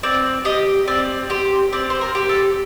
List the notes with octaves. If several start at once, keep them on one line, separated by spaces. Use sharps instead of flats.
C4 D5
G4 D#5
C4 D5
G4 C5
C4 D5
C5
A#4
G4
A4